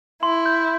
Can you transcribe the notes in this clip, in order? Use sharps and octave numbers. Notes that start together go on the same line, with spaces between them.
E4 C6
G6